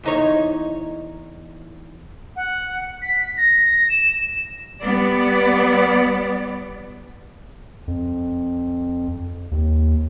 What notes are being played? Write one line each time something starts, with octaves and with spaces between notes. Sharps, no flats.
E2 D#4 C#5
F#5
B6
A#6
E7
G3 B3 D5
F2
D#2